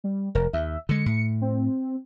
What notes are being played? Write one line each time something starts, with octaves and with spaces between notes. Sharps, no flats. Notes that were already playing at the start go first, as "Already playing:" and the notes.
G3
F1 A#4
D#2 E5
D3 G#3 C#7
A2
C4